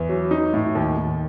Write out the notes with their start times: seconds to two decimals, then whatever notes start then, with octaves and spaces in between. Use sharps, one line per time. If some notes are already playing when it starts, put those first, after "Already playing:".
Already playing: E2
0.09 F#3
0.31 D#4
0.54 A2
0.75 D#2
0.97 D#2